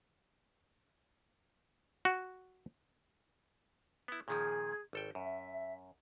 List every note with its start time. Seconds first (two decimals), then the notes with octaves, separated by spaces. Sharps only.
2.05 F#4
4.08 B3 E4
4.28 A#2 D#3 F3 G#4 G#6
4.93 G#1 A4 G5
5.15 F#2 E5